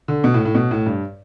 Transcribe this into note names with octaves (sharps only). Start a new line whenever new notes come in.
D3
B2
A2
A2
B2
A2
G2